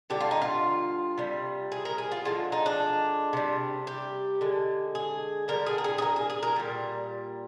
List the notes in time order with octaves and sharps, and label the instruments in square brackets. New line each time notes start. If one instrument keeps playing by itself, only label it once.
[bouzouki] D3 G3 G4
F4
D#4
F4
C3 G3
G#4
A#4
G#4
F4
D3 F3 G#3 F4
D#4
D4
C3 G3
G4
D3 G#3
G#4
D3 G3 A#4
G#4
A#4
G#4
G#4
A#4
G#4
G#4
A#4
A#2 G3